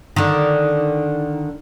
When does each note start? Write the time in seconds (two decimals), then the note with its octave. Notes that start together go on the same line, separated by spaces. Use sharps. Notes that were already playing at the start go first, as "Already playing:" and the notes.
0.16 D3 D#3